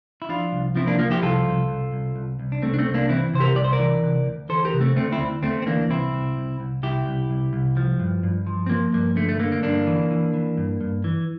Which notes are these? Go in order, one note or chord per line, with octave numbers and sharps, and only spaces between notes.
E4
F3 D4 F4
C2
F3 C4 E4
A#3 D4
F3 A#3
E4 G4
C2 F4 A4
C2
C2
C2
C2
C2
D4
C2 A3 C4
D4
A3 C4
C2
A#3 D4
E3 C4 E4
C3 C5
G4 A#4
C2 D5
C5
A#4 D5
E3
C3
D2
E3 A4 C5
G4 A#4
C3
A3 C4
D2 A3 C4
C4 E4
D2
D2 A3 C4
C4
E3 A#3 D4
C2 C4 E4
C2
C2
C2
C2 E4 G4
C2
C2
C2
F3
G2
G2
F3
C4
F3 A#3
G2 A#3
D3 A3
A3
D3 A#3
A#3
G2 A#3 D4
E3
E3
E3
G2
G2
E3